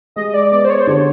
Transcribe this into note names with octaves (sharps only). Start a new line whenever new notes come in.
G#3 D#5
D5
B3 D5
C5
C#5
C5
D3 C#5